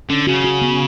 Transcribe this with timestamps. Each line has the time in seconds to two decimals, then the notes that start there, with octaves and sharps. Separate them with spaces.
0.09 D3 C#4
0.27 C#3 F#4
0.44 F#4
0.62 B3